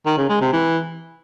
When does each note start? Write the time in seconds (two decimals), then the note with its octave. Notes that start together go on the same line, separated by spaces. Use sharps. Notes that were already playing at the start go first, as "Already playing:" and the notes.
0.06 D#3
0.18 C#3
0.29 G#3
0.41 C3
0.53 E3